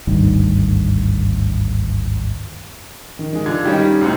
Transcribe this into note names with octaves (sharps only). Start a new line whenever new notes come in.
G#1 D2 G2 D#3
D#3
D#3 G#3
D3 F4 G#6
D#3 G3 C#4 D#4 G4
D2 A2 C3